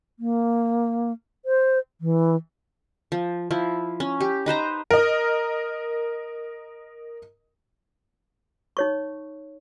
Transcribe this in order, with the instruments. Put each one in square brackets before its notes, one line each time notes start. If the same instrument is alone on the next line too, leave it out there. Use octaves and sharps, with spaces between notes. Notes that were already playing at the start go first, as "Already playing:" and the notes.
[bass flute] A#3
C5
E3
[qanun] F3
F3 E4
C#4
G4
D#4 B4 C5 A#5
[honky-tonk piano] A#4 D#5
[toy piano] D#4 C#5 C#6